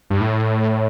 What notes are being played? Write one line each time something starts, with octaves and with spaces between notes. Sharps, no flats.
G2
A2